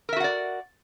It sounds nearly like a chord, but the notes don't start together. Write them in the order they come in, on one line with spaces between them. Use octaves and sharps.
A#4 E5 F#4 F#5 D5